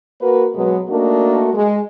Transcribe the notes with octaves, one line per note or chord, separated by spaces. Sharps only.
A#3 F#4 A#4 B4
B2 F#3 G#3 B3
A3 A#3 D4 D#4 F#4 A#4
G#3